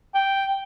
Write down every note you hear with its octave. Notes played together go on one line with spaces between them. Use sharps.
G5